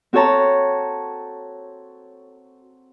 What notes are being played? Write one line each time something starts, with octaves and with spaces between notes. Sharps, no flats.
C4 F#4 A4 C#5 A5 A#5